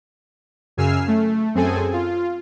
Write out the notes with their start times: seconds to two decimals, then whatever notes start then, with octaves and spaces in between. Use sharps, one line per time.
0.77 F#2 C#3 G#5 E6 F6 C7
1.08 A3
1.55 F#2 C4 G#4 A4 G#5
1.93 F4